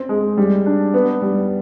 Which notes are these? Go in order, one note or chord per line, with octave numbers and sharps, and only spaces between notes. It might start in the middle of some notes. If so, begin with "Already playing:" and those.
Already playing: C4
G#3
G3
D4
B3
G3